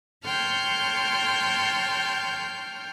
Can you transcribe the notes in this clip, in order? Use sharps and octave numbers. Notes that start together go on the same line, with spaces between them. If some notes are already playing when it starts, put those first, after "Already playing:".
C#5 G5 A5 C6 F6 G6